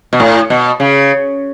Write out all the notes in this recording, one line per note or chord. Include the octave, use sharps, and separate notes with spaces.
B2
A2
B2
C#3